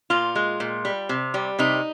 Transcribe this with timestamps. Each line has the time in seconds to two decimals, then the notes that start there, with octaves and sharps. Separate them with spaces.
0.10 A#2 F4
0.35 G#3
0.60 A#2
0.85 G3
1.09 C3
1.34 G3
1.59 C3 D#4